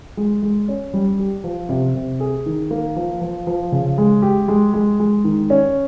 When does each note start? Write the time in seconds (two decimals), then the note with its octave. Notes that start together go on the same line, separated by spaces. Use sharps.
0.17 G#3
0.42 G#3
0.68 C#4
0.93 G3
1.19 G4
1.44 F3
1.69 C3
1.95 C3
2.20 G#4
2.46 D#3
2.71 A#3
2.96 F3
3.21 F3
3.47 F3
3.72 C#3
3.98 G#3
4.22 G4
4.48 G#3
4.74 G#3
5.00 G#3
5.24 D#3
5.50 C#4